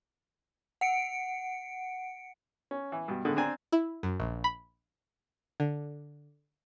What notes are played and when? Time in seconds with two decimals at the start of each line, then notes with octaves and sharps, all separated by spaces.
0.81 F#5 C#7 D7
2.71 C#4
2.92 E3
3.08 G2 B2
3.25 D3 D#3 G#3 A3 B3
3.36 C4 D4 G#5 A#5
3.72 E4
4.03 F#2
4.20 A#1
4.44 B5
5.60 D3